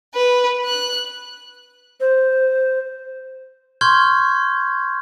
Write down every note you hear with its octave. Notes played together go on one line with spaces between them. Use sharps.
B4
F#6
C5
C6 C#6 F6 G6 G#6